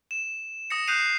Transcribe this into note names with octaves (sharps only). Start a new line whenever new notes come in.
E7
D#6 A#6 C#7
D#6 F#6 G6 C7 D#7 F7